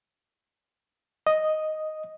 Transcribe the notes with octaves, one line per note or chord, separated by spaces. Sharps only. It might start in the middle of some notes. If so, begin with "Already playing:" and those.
D#5